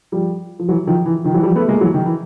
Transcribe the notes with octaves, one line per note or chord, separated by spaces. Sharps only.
F3 G3
F3
E3 F#3
D#3 F3
E3
D#3 F3
E3 F#3
F3 G3
A3 B3
G#3 A#3
E3 F#3
D#3
E3